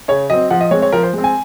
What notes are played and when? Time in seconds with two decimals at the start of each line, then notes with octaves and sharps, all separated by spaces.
0.08 C#3 C#5
0.30 F#3 C4 D#5
0.50 F3 F#5
0.61 D#5
0.71 G#3 C4 C#5
0.82 C#5
0.92 F3 A#4
1.03 C5
1.14 G#3 C4
1.24 G#5